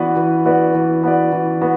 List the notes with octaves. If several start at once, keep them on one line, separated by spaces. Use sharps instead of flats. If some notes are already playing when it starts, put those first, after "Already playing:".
Already playing: E3 B3 F#4 B4 D5
E3
B3 F#4 B4 D5
E3
B3 F#4 B4 D5
E3
B3 F#4